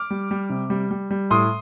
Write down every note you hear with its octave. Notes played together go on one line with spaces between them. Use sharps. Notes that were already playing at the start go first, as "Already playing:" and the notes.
Already playing: D6 F6
G3
G3
C3
G3
G3
G3
A2 C6 D#6